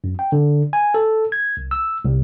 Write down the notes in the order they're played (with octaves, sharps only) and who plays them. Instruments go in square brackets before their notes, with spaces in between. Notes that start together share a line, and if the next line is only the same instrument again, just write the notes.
[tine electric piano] F#2
G5
D3
G#5
A4
G#6
C2
E6
C2